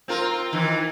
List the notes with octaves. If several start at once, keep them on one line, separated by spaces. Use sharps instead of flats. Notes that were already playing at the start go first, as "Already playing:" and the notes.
C4 F4 A#4
D#3 E3